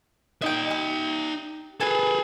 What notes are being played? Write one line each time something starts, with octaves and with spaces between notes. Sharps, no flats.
D#4 D#5 E5 G5
G4
G#4 A4 B4 G#5